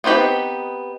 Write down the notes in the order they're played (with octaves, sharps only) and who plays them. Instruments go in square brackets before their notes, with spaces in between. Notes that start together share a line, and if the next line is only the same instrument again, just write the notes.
[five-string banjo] B3 C4 D#4 G4 B4